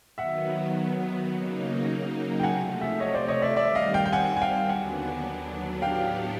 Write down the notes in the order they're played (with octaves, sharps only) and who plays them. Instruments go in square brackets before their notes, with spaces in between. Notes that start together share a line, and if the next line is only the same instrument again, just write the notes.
[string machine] D#3 F#3 B3 [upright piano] E5 F#5
[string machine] C#3 F#3 A#3 D#4
[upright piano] G5
[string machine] C3 F3 A3 [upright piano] F#5 G#5
[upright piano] E5 F#5
C#5 D#5
C5 D5
C#5 D#5
D5 E5
[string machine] D#3 G3 C4 [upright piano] D5 E5
[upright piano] D#5 F5
F5 G5
G5
F#5 G#5
G#5
F5 G5
[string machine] D#2 D3 F#3 B3 D4 [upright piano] F#5 G#5
[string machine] A2 F#3 B3 D4 G4 [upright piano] F5 G5